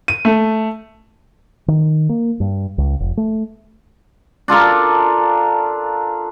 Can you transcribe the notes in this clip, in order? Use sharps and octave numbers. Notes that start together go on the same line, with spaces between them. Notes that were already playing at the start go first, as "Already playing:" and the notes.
D#7
A3
D#3
A#3
G2
C#2
F1
A3
D4 F4 A4 A#4